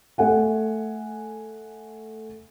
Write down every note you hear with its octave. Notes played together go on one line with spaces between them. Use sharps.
A3 A4 F#5 G#5